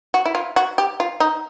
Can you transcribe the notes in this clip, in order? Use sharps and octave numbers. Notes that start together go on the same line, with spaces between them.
F#4
E4
F4
F#4
G4
F4
D#4